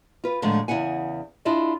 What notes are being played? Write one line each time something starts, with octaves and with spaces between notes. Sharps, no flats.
F4 B4
A2 D3 D#3 F3 G#3 A3
E2 C#3 E4 F#5 G#5
D4 E4 F4 G#4 D#5